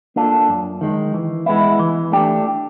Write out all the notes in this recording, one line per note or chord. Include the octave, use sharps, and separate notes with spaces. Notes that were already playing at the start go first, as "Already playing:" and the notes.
A#3 D4 F4 A4
F#2
D#3 G#3
E3
G#3 B3 E4
E3
A3 D4 G4